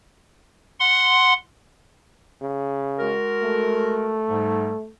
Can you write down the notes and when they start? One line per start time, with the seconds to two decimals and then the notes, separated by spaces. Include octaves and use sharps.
0.80 F#5 C6
2.41 C#3
2.98 G#3 F#4 A#4
3.42 A3
4.28 G#2 G3